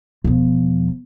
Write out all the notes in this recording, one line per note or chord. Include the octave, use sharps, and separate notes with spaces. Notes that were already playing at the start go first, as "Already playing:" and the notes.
E1 F3